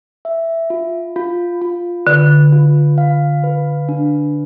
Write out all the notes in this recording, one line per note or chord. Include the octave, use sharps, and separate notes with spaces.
E5
F4
F4
F4
D3 B4
F4
F5
B4
D4